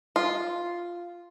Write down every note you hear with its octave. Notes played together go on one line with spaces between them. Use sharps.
F4